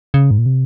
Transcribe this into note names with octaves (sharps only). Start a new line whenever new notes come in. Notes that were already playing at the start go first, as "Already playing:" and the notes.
C#3
G#2
A#2
C3